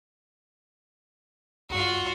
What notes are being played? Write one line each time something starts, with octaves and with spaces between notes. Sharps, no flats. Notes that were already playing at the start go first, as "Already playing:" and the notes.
C#2 G2 F4 F#4